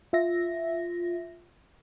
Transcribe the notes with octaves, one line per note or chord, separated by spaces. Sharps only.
F4 E5 A#6